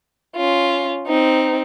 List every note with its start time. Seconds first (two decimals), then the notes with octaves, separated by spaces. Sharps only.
0.37 C#4 F4
1.08 C4 D#4